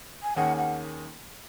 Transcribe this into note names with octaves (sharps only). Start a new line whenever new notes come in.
G#5
D#2 D#3 A#3 C#4 G#4 F#5
F#5